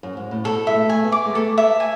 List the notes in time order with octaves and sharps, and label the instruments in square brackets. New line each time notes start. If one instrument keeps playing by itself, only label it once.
[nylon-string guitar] F#2
G#2
A2
[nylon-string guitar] B2 [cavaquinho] A4
[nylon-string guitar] G#3 [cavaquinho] E5
[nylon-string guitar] A3
[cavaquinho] G#5
[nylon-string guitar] B3
[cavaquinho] D6
[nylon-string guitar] G#3
[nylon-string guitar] A3 [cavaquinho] A4
[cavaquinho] E5
G#5